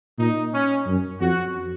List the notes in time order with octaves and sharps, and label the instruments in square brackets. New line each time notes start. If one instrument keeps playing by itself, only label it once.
[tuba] A#2 [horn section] D#4
[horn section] C#4
[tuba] F#2
[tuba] F2 [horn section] F#4